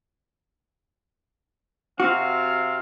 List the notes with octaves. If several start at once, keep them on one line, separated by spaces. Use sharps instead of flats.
C3 C4 F#4 F5